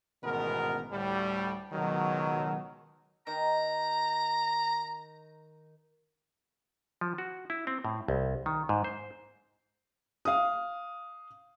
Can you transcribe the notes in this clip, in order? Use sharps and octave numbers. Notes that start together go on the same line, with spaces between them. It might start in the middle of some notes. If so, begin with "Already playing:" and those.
A1 G#2 B2 D#3 B3 A#4
D2 A2 G3
C#2 B2 D#3 F#3
D#3 A#5
F3
F#4
E4
C4
A2
C2
D#3
G#2
C5
F5 D#6